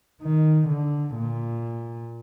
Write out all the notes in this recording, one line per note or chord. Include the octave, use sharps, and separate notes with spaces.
D#3
D3
A#2